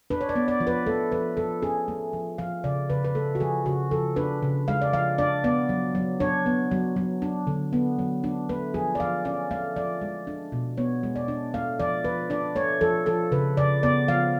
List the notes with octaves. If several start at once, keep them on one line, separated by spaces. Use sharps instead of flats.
D4 B4
C#5
D5
B3
D5
F3
B4
A3 A4
F3 B4
F3 A4
C#4 G#4
A3
F3
F3 F5
C#3 D5
C#3 B4
B4
A3 A4
F#4
F3 G#4
C#3 F#4
F3 A4
D4 B4
C#3
G#3 F5
D5
F3 F5
D4 D5
B3 D5
F#3
F#3
D4 C#5
B3
F#3
F#3
D4
D3
B3
F#3
D4
A3 B4
F3 G#4
D5
F3 F5
C#4 D5
A3 F5
F3 D5
G#3
D4
B2
B3 C#5
G#3
D5
D4
A3 F5
F3 D5
F3 B4
D4 D5
A3 C#5
F3 A4
F3 A4
C#3 B4
C#3 D5
B3 D5
F3 F5